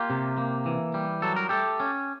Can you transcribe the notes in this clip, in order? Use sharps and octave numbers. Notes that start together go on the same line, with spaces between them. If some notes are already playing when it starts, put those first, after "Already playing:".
Already playing: A#3 F4 G4
C3
A#3
E3
G3
F#3 A4
A#4
A3 G4 A4
C#4